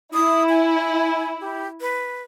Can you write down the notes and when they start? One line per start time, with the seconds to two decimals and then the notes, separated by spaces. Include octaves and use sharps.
0.14 E4 D#6
0.49 G#5
1.41 G4
1.81 B4